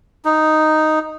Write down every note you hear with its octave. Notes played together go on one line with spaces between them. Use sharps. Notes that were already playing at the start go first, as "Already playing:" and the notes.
D#4